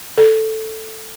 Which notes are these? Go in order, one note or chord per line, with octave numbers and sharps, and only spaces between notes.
A4